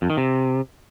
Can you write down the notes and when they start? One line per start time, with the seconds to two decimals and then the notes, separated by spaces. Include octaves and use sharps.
0.02 F2
0.10 D#3
0.17 C3